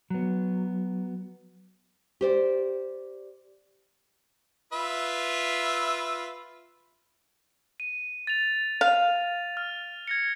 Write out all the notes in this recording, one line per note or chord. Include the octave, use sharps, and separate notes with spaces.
F#3 B3
G4 C5 D5
F4 B4 E5
D#7
A6 F7
F5 F7
F6
G#6 A#6 C#7